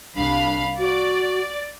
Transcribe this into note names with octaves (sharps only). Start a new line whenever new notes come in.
C2 D4 F5 B5
F#4 D5